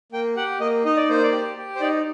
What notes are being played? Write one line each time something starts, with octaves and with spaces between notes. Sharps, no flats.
A#3 G5
G4 F#5
A#3 D#5
D#4 D#5
D5
A#3 C5
D5
G4
G4
C5
D#4 D5